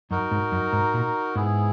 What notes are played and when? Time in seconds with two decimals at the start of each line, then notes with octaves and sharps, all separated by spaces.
0.11 F#2 D#4 F#4 A#4
0.31 G#2
0.52 F#2
0.73 G#2
0.94 A#2
1.36 G#2 B3 E4 G#4